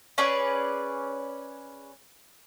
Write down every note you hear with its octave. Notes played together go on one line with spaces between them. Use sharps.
C#4 G#4 B4 D5